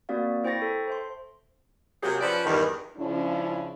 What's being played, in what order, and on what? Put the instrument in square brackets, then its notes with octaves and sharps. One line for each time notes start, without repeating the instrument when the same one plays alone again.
[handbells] A#3 C4 F#4 D5 F5
E4 C5 G5 C#6 A6 A#6
A4
C5 E5 C6
[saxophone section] C3 F#3 A#3 G4 G#4
F3 C#4 B4 C5 D5
E2 G2 D#3
[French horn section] G#2 C#3 F3 C#4 D4 E4